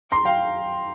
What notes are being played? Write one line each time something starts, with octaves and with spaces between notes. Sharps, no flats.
A#5 C6
F5 G5